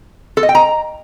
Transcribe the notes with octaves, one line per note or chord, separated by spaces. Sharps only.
A4
D#5
G5
A#5